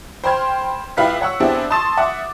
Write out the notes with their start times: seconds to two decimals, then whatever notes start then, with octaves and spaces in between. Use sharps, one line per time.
0.24 C5 G5 B5 C6 F6 G#6
0.97 C#2 E4 B4 F5 G5 B6
1.21 C#5 F#5 C#6 E6
1.40 B3 C4 D4 E4 G4 G#4
1.70 A5 C6 C#6 D#6 A6 E7
1.97 E5 F#5 D6